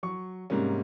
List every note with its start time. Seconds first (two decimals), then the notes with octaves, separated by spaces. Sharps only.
0.03 F#3 C#6
0.50 G#2 C3 G3 A#3 C#4